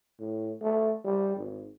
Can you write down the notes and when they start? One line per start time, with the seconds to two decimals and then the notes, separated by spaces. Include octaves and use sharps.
0.20 A2
0.62 A3
1.05 G3
1.37 G#1